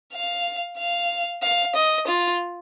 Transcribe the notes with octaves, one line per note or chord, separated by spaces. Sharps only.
F5
F5
F5
D#5
F4